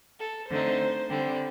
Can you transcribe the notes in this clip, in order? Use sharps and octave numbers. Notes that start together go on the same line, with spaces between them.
A4
D3 A3 C4 D#4 C5
D3 G3 C4